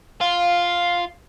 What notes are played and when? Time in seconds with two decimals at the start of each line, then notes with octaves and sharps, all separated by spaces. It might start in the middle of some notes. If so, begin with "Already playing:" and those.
0.21 F4 F5